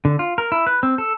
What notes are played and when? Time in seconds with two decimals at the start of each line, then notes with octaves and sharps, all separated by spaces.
0.05 D3
0.19 F4
0.38 A#4
0.52 E4
0.67 B4
0.83 C4
0.98 A4